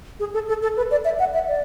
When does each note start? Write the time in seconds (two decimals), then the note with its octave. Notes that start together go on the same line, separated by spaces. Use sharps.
0.20 G#4
0.34 A4
0.48 A4
0.63 A4
0.77 B4
0.91 D5
1.05 E5
1.19 F#5
1.34 E5
1.48 D5